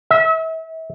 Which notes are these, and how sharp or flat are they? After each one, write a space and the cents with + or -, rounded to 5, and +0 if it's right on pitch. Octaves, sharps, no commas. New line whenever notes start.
E5 -35